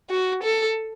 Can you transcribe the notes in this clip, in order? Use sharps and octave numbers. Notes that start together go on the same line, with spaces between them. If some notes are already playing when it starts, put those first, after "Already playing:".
F#4
A4